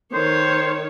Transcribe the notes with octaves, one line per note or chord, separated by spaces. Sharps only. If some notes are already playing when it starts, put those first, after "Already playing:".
D#3 C5 C#5